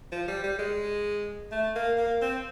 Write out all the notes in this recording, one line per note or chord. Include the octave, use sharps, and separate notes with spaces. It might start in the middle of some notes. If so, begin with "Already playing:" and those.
F3
G3
G3
G#3
A3
A#3
A#3
C4